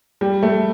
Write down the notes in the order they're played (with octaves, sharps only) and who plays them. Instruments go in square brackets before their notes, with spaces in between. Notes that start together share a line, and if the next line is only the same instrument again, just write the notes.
[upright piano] G3
A3